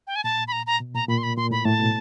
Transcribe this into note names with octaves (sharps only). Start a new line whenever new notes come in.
G5
G#5
A#2 A5
B5
A#5
A#5
B2
A#2 A#5
A#2 B5
C6
B5
A#2 C6
A2 B5
A2 A5
B2